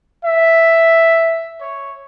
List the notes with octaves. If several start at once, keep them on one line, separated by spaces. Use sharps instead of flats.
E5
C#5